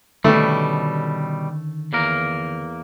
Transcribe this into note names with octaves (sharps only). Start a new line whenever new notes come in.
B2 D3 D#3 G3 A3 C#4
E2 A#3 A#4